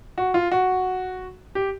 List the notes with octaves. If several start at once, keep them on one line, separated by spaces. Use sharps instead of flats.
F#4
F4
F#4
G4